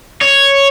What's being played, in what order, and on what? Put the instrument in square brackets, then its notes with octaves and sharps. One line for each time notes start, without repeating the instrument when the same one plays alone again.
[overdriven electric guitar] C#5